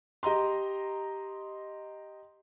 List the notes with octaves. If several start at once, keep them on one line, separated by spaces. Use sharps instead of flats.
G4 D#5 A#5 C6